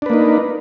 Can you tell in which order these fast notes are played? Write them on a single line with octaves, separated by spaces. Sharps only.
D4 B4 A#3 D#4